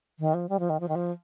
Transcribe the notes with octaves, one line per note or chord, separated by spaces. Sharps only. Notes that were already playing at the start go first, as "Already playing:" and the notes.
D#3
F3
G3
F3
D#3
F3
D#3
F3